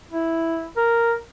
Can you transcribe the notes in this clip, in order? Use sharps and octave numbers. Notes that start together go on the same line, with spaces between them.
E4
A#4